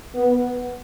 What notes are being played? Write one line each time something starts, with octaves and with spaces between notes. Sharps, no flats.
B3